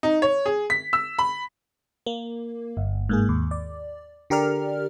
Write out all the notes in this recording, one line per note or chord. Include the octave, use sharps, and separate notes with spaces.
D#4
C#5
G#4
B6
E6
B5
A#3
G1
G#2 A#3 G#4
D#2
D5
D3 G4 A#4 D5 F6